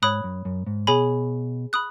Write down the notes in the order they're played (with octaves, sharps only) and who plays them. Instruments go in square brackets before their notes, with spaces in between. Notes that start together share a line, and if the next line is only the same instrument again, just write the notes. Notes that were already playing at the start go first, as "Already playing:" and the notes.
[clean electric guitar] G#2 [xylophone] C#5 B5 D#6 F#6
[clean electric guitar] F#2
F#2
G#2
[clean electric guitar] B2 [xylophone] G#4 C#5 G#5 B5
[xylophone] B5 D#6 F#6